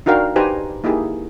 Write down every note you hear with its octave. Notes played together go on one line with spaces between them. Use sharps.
D4 D#4 F#4 A#4 F5 G5
D#4 G4 B4 C5 G#5 A#5
A#3 D#4 E4 G4 G#4